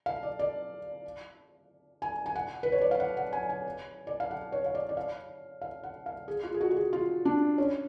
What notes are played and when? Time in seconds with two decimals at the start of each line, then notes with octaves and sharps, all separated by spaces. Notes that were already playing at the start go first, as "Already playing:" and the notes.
0.06 F5
0.23 D5
0.39 D5
2.02 G#5
2.26 G#5
2.36 F#5
2.63 B4
2.72 C#5
2.81 D5
2.91 F5
3.00 F#5
3.17 F#5
3.33 G#5
3.49 G#5
4.07 D5
4.20 F5
4.31 F#5
4.52 C#5
4.66 F5
4.75 D5
4.89 D5
4.97 F5
5.62 F5
5.83 F#5
6.06 F5
6.28 G#4
6.43 F4
6.54 G#4
6.61 F#4
6.71 F#4
6.77 G#4
6.93 F4
7.25 D4
7.58 C#4